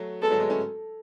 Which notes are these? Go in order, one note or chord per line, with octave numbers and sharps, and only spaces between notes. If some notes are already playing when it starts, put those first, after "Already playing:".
Already playing: F#3 A3
G#3 B3 A4
F#3 A3
G#3 B3
A3 C#4